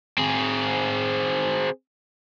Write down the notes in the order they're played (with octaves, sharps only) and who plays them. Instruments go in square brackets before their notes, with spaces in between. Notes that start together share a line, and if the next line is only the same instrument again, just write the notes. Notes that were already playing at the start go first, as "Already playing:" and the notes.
[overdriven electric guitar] C4 G#4